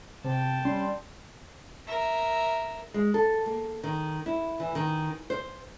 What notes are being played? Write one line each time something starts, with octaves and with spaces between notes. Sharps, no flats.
C3 G5 A5
G3 C#4 C6
A#4 E5
G#3
A4
A#3
D#3
E4
E3
D#3
C5